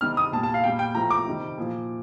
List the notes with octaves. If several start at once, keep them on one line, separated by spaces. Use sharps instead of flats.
C3 D#3 G3 F6
D#6
A#2 G3 A5
A5
F5
A#2 G3 G5
G5
A2 F3 A#5
D6
C3 D#3 G3
A#2 F3